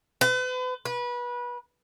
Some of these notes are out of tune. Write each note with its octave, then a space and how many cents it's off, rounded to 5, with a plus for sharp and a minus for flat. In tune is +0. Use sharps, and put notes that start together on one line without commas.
B4 +40
B4 -25